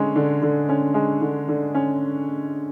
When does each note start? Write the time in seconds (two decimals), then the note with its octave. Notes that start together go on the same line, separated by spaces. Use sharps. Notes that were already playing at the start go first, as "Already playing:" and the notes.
Already playing: D3 G#3 C#4
0.16 D3
0.42 D3
0.69 C#4
0.94 G#3
1.21 D3
1.48 D3
1.74 C#4